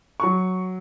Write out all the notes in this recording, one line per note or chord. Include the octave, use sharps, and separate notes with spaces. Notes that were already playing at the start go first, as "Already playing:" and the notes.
F#3 C#6